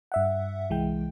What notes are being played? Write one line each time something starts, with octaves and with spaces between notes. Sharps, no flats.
G2 E5 F#5
C2 E3 G#3 G5